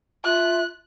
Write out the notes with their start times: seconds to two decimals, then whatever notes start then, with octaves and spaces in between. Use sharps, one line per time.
0.24 F4 E5 F#6